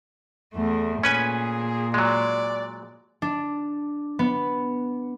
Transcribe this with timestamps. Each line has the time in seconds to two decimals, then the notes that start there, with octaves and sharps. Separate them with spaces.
0.54 E2 A3
1.03 A#2 C#4 G#4 B4 G#5
1.94 F#3 G#3 D5
3.22 D4
4.19 B3